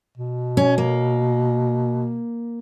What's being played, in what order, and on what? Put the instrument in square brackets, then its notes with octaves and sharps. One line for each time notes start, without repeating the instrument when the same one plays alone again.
[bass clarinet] B2
[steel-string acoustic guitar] C#4
A#3